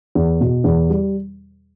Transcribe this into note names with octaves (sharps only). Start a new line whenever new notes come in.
E2
B2
E2
G3